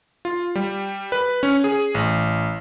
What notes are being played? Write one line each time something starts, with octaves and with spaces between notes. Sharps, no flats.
F4
G3
B4
C#4
G#4
A1